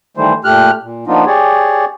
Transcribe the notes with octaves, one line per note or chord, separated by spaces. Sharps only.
D#3 E3 G3 A3 C5
A#2 A3 G4 F6 F#6
A#2
F3 A#3 B3 D4 D#4 F4
G4 G#4 C#5 D5